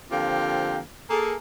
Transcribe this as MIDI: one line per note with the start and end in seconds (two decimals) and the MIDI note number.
0.11 0.79 50
0.11 0.79 53
0.11 0.79 58
0.11 0.79 60
0.11 0.79 65
0.11 0.79 67
1.10 1.34 58
1.10 1.34 68
1.10 1.34 69